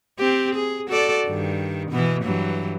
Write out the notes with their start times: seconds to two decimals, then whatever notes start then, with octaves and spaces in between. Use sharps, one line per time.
0.18 C4 G4
0.55 G#4
0.88 F#4 A4 D5
1.27 G2 D#3
1.90 B2 E3 B3
2.23 G2 E3 F#3